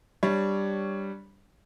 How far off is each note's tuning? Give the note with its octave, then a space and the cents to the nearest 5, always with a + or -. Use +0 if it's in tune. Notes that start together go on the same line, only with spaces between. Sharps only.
G3 +0 D4 +0 C#5 +5